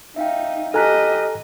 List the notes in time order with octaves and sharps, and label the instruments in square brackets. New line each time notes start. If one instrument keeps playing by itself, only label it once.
[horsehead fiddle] D#4 [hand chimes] E5 F5 G5
[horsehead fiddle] G4 D#5 [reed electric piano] A4 G#5 A#5 [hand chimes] F6 F#6 B6